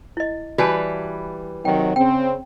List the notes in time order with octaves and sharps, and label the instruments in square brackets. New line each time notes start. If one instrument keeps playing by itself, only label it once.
[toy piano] E4 D#5
[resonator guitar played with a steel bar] E3 G3 B4 [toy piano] F#4 G#5 A5
[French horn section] C3 D#3 F#3 [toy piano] G5
[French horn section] C#3 C4 [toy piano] G5